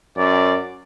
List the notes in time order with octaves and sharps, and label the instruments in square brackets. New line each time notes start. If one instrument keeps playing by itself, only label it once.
[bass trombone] F#2 [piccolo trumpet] D5